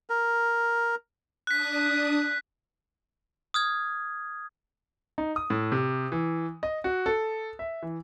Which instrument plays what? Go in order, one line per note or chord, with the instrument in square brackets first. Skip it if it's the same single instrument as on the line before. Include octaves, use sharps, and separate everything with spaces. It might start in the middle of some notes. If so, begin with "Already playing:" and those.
[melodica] A#4
[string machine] D4 D#6 [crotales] F#6 B6
[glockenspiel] D#6 F6 G#6
[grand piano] D#4
D#6
A2
C3
E3
D#5
F#4
A4
E5
E3